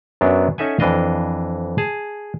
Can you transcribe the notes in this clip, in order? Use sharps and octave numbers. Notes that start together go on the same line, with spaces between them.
F#2 F#3 B3 D4
C#4 D#4 A4 E5 F#5 G#5
F2 E3 D4 D#5 F5
G#4 A5